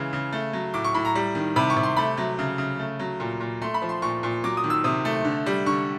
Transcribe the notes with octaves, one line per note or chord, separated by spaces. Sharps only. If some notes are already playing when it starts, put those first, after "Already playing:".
Already playing: C#3 E3 G#3
C#3
A3
F#3
A2 D6
C#6
A2 B5
A#5
G3
D#3
C3 B5
C#6
C3
C6
A3 B5
F#3
C#3
C#3
A3
F#3
A#2
A#2
A3 C6
B5
F3
C6
A#2 C#6
A#2
F#3 D6
D#6
D#3
E6
C3 D#6
A3
D3
G3
D3 C#6